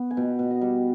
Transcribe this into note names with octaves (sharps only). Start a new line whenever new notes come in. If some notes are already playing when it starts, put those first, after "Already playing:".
Already playing: B3
G#5
B2 G5
B2
D#5
G3